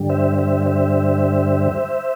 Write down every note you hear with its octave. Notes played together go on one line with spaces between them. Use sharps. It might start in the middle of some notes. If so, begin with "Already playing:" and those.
Already playing: G2 D3 G3
C5 E5
C5 E5
C5 E5